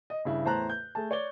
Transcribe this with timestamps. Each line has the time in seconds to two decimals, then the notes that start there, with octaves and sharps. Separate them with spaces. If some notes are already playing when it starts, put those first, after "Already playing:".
0.10 D#5
0.25 G2 C#3 E4
0.44 E2 A2 C5 A5 A#5 F#6
0.70 G6
0.95 A3 G#4 A5
1.11 C#5 D5 G7